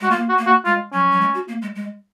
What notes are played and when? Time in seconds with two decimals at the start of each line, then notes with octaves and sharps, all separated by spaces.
0.01 G#3 F#4
0.11 A#3 F4
0.29 F#4
0.39 A#3
0.47 F#4
0.66 G#3 F4
0.93 F#3 C#4
1.11 F#3
1.21 G#3
1.34 F#4
1.48 A#3
1.62 G#3
1.76 G#3